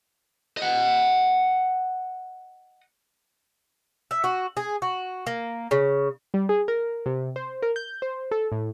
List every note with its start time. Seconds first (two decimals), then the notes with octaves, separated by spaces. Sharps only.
0.57 D#5 F#5
4.11 E5
4.24 F#4
4.57 G#4
4.82 F#4
5.26 A#3
5.71 C#3
6.34 G3
6.49 G#4
6.68 A#4
7.06 C3
7.36 C5
7.62 A#4
7.76 G6
8.02 C5
8.31 A4
8.52 A2